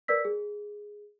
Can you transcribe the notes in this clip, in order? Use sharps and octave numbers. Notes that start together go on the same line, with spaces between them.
A#4 B4 D5 E6 B6
G#4